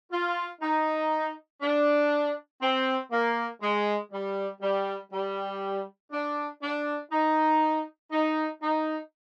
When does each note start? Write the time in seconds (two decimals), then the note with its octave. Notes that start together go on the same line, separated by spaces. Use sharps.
0.12 F4
0.61 D#4
1.62 D4
2.62 C4
3.11 A#3
3.62 G#3
4.12 G3
4.61 G3
5.12 G3
6.12 D4
6.62 D4
7.12 D#4
8.11 D#4
8.62 D#4